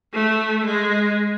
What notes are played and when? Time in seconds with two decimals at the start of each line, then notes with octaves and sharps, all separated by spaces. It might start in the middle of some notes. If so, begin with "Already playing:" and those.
0.13 A3
0.65 G#3